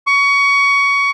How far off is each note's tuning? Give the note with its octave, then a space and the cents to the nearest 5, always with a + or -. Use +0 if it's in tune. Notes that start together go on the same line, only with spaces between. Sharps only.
C#6 +20